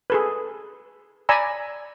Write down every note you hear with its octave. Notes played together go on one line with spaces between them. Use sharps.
G#4 A4 B4
D5 G#5 A#5 B5 E6